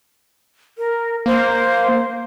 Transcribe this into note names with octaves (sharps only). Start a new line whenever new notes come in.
A#4
A#3 C5